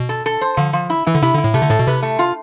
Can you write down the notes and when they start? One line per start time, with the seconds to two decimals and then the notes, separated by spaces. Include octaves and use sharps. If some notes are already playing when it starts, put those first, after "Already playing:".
Already playing: B2
0.09 A4
0.26 A4
0.41 C5
0.57 D3 F3
0.73 F3
0.90 E4
1.06 E3 E4
1.14 D3
1.22 C3 E4
1.33 D3 E4
1.44 A2
1.54 C3 A3
1.62 D3
1.70 A2 A4
1.79 B2
1.87 C3 B4
2.03 A3
2.19 F4